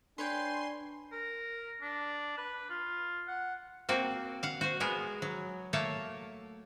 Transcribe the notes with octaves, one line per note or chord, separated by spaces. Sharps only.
D4 B4 C#5 G5 G#5 C6
A#4
D4
B4
F4
F#5
A#3 C4 F#4
F5 F#5
F#4 C5
G#3 B3 G#4 A#4
F#3
A3 A#3 C#5 A5